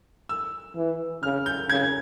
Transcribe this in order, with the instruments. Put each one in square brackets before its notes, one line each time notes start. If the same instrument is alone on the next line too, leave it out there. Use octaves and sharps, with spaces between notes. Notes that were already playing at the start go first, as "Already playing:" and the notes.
[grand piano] E6
[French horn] E3
[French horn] C#3 [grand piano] F6
[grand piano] G6
[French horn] C#3 [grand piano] G#6